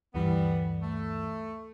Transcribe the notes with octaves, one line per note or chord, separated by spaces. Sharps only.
D2 G2 E3 G3 B3
A3